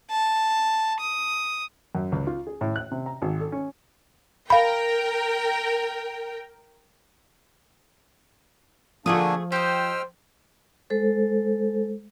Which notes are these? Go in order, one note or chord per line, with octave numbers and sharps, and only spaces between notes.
A5
D#6
F#2
C#2
F4
G#4
A2
F#6
C3
A#5
G#1
A4
C#4
A#4 F5 G5 B5
D3 F3 A3 A#3 D4 F4 G#4 D#6
G4 C5 D#5 G5 E6 F6
G#3 A4 C5